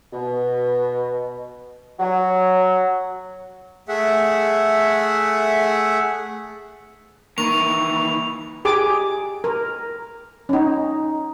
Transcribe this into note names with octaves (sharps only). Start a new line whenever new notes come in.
B2
F#3
A3 G#4 E5 F#5
D#3 E3 A#3 A#5 C#6 D#7 F7
G4 G#4 D6
A#4
C#4 D#4